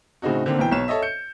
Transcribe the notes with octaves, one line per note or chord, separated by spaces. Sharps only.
A2 C#3 C4 D#4 F#4
D3 D#3 A#3 C4
B1 E3 G5
B1 C#5 E7
A4 C#5 D#5 E5
G6 C#7